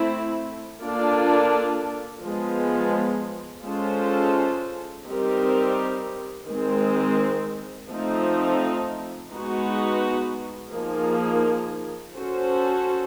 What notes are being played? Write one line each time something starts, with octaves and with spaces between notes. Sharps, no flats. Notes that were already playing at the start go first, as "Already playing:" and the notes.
Already playing: A3 C4 E4
A#3 D4 F4 A4 D5
F3 G#3 B3
G#3 C#4 F4 A4 C5
G3 C4 D#4 G4 A#4
D#3 G#3 C4
F3 A3 C4 D#4
G#3 B3 D#4 F#4 B4
F3 A#3 D#4 G#4
C#4 F#4 A4 C5